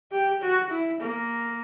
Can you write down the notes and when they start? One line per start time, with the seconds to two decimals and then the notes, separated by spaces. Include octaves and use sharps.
0.12 G4
0.42 F#4
0.70 E4
1.00 A#3